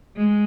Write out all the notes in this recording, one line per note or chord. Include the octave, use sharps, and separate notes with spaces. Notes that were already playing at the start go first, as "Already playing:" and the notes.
G#3